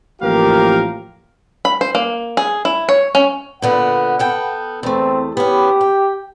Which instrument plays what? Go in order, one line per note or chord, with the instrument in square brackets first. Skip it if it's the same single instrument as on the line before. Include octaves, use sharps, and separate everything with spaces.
[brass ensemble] A1 F3 A#3 G4 A#4 F5
[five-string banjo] B5
C5
A#3
G#4
E4
C#5
C#4
[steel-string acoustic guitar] A#2 D3 B3 [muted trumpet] F#5
[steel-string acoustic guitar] B3 A4 G5
[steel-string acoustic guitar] E2 A3 [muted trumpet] C4
[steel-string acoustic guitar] B3 C#4 [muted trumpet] G4
[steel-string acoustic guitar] G5